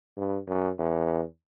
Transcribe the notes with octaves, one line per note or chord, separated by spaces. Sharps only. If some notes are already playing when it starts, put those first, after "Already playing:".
G2
F#2
E2